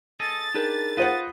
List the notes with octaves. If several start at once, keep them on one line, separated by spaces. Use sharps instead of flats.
G#4 A4 D#5 A6
D4 D#4 G4 G#4 A#4 B4
F4 B4 C5 D#5 F#5